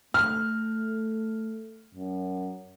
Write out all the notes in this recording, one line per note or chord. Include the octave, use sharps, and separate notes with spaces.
A3 F6
F#2